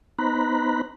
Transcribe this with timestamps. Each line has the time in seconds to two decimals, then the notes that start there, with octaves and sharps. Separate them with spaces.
0.19 B3 D#4 C5 A#5 B5 F#6